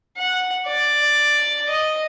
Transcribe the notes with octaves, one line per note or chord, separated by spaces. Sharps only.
F#5
D5
D#5